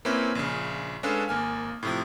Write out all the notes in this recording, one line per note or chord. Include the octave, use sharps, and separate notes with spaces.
A#3 C4 C#4 E4 B4 C#5
A#1 C#3
G#3 C#4 D4 A4 B4 F5
G#1 A#3 G#5 F6
A2 C3 F3